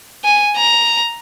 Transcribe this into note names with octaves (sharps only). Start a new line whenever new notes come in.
G#5
A#5